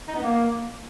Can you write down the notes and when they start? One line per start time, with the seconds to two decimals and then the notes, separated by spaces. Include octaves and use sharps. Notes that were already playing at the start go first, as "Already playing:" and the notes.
0.08 D#4
0.16 B3
0.23 A#3